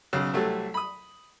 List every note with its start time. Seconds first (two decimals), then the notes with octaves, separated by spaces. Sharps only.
0.13 B1 C#3
0.33 C2 F#3 G3 A3
0.74 B5 D#6